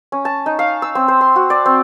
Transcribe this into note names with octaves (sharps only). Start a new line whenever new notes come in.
C#4
A5
D#4
F5
E6
C4
C5
C6
F#4
D5
C4